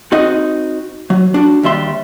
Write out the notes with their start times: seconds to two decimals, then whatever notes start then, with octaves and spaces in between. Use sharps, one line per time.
0.12 C4 D#4 F#4 D#5
1.10 F#3
1.34 D4 F#4
1.63 D#2 G3 E5 C6